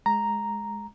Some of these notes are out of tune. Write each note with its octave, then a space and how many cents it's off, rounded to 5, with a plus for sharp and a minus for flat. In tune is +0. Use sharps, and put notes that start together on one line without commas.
G#3 +5 A#5 +0